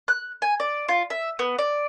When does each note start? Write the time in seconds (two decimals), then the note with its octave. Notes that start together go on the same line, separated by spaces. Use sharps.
0.08 F#6
0.42 G#5
0.60 D5
0.89 F4
1.10 E5
1.39 B3
1.59 D5